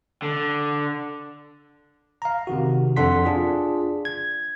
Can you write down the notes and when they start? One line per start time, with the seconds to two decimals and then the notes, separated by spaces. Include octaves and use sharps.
0.22 D3
2.22 F5 A#5
2.47 C3 D#3 F#4
2.96 F2 D4 A4 F#5 C6 B6
3.25 D4 F4 G#4
4.05 G#6